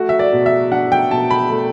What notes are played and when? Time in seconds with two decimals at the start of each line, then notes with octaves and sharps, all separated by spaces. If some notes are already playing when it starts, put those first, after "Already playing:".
Already playing: A3 F#4
0.09 E5
0.19 D5
0.33 B2
0.46 E5
0.72 D4 F#5
0.92 G5
1.11 B2 A5
1.31 B5
1.50 A3